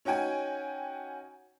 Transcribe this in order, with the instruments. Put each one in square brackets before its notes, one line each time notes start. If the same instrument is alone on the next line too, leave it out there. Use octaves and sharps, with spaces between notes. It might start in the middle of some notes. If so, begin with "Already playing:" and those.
[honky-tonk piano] C#4 D#4 F#4 G5 G#5